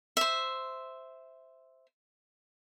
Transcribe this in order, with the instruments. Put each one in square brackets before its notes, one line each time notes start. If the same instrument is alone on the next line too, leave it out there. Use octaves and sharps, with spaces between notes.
[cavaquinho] C5 E5